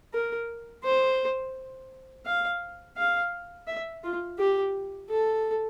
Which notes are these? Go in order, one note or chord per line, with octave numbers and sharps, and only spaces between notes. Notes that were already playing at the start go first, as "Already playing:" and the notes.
A#4
C5
F5
F5
E5
F4
G4
A4